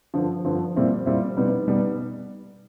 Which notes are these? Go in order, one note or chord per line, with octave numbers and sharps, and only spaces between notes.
G2 D3 F3
G2 D3 F3
A#2 G3 C4 E4
A#2 G3 C4 E4
B2 G3 B3 D#4
B2 G3 B3 D#4